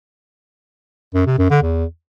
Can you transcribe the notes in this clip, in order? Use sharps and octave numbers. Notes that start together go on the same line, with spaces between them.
F#2
C3
F#2
D3
E2